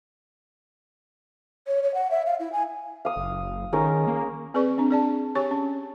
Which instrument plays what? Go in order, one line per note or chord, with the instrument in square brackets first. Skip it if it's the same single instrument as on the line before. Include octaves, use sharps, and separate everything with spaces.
[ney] C#5
C#5
F#5
E5
F5
E4
G#5
[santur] F5 D#6
[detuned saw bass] F#1
[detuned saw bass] D#3 [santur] G#3 C#4 A#4
[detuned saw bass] A#3
[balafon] C4 G#4 B4 D5 C#6
C4 D4
G#4 D5 A5
G4 C#5 G#5 C#6
C#4